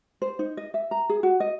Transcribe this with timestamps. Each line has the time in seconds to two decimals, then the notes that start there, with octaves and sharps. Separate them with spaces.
0.22 C5
0.39 D#4
0.57 D#5
0.74 E5
0.91 A#5
1.09 G#4
1.23 F#4
1.40 D#5